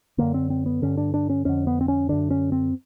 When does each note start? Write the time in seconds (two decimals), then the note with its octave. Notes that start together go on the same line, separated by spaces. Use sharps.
0.18 F#2 D3 A#3
0.34 C4
0.50 C4
0.66 B3
0.82 G2 D3 C#4
0.97 D4
1.14 D4
1.30 C#4
1.45 F2 D3 C#4
1.67 B3
1.81 C4
1.88 C#4
2.09 F#2 D3 D4
2.31 C#4
2.52 C4